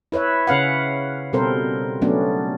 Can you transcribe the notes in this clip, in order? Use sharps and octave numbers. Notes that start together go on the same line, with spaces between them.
E4 B4 C#5 E5
C#3 C#4 B4 F5 F#5
B2 G3 C4 A4 A#4 C5
F#3 A3 B3 C#4 D4